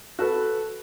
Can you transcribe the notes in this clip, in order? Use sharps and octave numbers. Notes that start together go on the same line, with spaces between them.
F#4 A4 B4